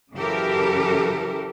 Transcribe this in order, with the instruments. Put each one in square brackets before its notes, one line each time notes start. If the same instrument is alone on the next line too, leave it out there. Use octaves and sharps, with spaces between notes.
[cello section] F#2 C#3 E3 G4 A4 A#4